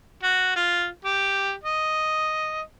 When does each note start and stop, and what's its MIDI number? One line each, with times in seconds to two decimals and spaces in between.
0.23 0.51 66
0.56 0.87 65
1.05 1.52 67
1.64 2.61 75